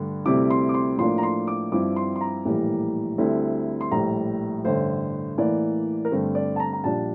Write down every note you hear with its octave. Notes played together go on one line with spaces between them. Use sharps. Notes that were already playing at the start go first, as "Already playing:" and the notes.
Already playing: G2 D3 A3
D2 C3 G3 C4 E4 D6
C6
D6
C6
A2 F3 A#3 D4 C6
A#5
C6
D6
G2 F3 C4 E4 D6
C6
C6
A#5
A#1 A2 E3 G3 A#3
D2 D3 G3 C4 E4
C6
A#1 A2 G3 A#5
A1 G2 D3 C5
A2 E3 A#3 D5
A#4
G2 D3 A3 C4 C5
D5
A5
A#5
A#5
A#1 A#2 G3 D4 A5